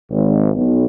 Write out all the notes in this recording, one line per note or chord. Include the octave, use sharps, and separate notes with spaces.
G#1
B1